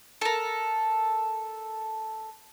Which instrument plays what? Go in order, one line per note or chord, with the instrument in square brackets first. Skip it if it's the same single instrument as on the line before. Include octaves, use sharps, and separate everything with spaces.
[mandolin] A4 A#4